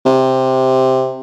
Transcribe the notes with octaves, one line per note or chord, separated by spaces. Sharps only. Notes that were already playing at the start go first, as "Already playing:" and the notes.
C3